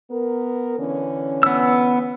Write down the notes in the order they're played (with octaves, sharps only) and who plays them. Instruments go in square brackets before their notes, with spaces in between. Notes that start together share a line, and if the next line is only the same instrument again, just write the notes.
[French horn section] B3 A#4
D3 E3 C#4
[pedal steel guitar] B3 E6